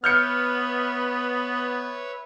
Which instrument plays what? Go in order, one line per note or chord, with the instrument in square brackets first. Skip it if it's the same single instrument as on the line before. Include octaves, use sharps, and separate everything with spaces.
[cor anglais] B3 [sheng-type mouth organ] B4 C#5 E5 [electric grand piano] F6 G6 C#7